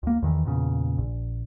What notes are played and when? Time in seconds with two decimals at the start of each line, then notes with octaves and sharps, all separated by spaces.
0.03 D2 A#3
0.22 E2 D#3 E3
0.45 E2 A#2 C#3
0.98 A#1